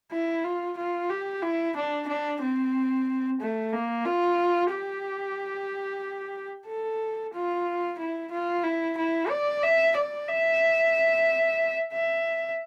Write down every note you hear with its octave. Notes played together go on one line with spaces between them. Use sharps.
E4
F4
F4
G4
E4
D4
D4
C4
A3
A#3
F4
G4
A4
F4
E4
F4
E4
E4
D5
E5
D5
E5
E5